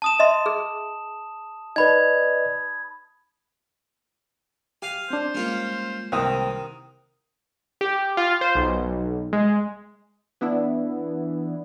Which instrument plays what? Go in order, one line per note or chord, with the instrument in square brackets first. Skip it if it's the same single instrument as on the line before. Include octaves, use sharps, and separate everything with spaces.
[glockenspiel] A5 D#6 E7
[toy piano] D#5 E5 C6
G#4
[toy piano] D#4 [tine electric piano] B4 D5 D#5 [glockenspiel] B5 G#6
[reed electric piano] G4 [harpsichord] F5 G#5
[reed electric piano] C4 D4 [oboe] C5
[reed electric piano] G3 G#3 A#3 [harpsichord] C#4 F4
[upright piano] C2 C4 D#6 [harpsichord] D#3
[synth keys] G4
F4
C5
B1
G#3
[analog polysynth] E3 B3 D4 E4